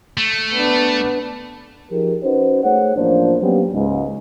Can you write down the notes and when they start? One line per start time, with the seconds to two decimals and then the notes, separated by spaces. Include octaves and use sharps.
0.17 A3
0.54 B3 D4
1.91 F3 D#4 G4 G#4 A#4
2.23 C#4 D#4 F#4 B4 C5
2.63 A3 G#4 C5 C#5 F#5
2.96 A1 F3 A#3 D4 C5
3.42 F#3 A#3 B3 C#4 D4 G4
3.73 C#2 G#2